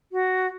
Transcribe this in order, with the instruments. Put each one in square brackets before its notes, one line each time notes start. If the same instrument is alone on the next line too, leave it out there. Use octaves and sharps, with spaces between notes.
[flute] F#4